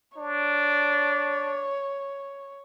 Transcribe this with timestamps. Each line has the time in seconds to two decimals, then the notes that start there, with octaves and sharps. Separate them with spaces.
0.17 D4 C#5